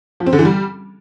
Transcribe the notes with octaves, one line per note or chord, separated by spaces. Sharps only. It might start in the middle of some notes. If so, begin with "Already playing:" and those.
F3
C4
D3
E3
G3